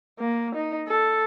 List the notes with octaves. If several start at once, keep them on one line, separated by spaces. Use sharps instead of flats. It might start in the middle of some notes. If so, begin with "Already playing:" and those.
A#3
D#4
A4